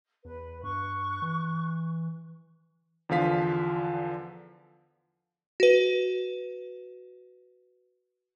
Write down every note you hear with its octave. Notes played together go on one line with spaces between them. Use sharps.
E2 B4
G2 C#6 F#6
E3
E2 D3 F3 F5 B6
F#4 B4